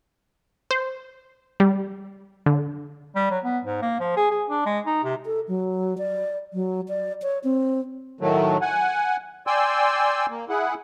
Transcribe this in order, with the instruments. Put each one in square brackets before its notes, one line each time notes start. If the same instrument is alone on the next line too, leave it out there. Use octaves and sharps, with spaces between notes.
[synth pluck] C5
G3
D3
[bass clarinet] G3
F#3
B3
G#2
A#3
F3
G#4
G#4
D4
G#3
D#4
C3
[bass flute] A4
F#3
D5
F#3
D5
C#5
C4
[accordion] A2 D#3 F#3 A3
F#5 G#5
D5 G5 G#5 C6 E6
A#3
E4 G#4 F#5